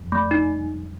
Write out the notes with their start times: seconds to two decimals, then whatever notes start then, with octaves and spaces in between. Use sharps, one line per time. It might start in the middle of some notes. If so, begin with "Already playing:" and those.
Already playing: F2
0.12 A3
0.31 D#4